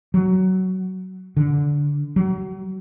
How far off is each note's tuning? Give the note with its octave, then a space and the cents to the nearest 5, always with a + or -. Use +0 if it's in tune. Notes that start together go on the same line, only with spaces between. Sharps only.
F#3 +15
D3 -15
F#3 +35